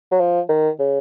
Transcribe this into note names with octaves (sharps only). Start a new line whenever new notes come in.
F#3
F3
D#3
C#3